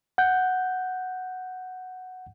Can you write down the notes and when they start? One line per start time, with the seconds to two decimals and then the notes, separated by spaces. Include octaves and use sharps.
0.18 F#5 G6